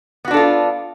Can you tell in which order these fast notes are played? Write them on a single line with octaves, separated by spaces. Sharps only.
B3 F#4 D4 A4 F4